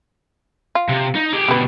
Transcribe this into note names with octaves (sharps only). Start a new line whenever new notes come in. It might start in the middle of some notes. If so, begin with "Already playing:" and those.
F4
C3
D#4
G4 G#4
B2 D3 G4 B4